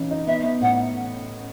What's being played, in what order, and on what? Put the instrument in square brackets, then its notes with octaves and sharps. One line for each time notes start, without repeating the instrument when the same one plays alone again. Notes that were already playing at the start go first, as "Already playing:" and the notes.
Already playing: [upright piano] C#3 E3 D#4
D#4
[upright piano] B3 [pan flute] E5
[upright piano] B3
[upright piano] A2 [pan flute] F#5